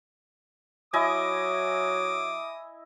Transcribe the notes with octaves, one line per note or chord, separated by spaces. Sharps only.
F#3 E4 D#5 G#5 D6 D#6